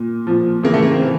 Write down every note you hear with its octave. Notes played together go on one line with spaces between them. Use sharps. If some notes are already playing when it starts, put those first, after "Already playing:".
Already playing: A#2
A#2 F3
C#3 E3 A#3
A3
A#3
C4
E3